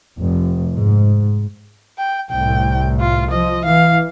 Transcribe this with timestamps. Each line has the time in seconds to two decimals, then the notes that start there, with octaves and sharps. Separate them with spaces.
0.19 F1
0.74 G#2
1.98 G5
2.30 C2 A2 G5
3.00 F4
3.31 F3 D#5
3.65 E3 F5